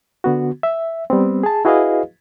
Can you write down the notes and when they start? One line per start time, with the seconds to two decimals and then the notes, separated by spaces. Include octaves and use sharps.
0.24 D3 B3 F#4
0.63 E5
1.10 G3 B3 C4
1.43 G#4 A5
1.65 E4 F#4 G#4 B4 D#5 F5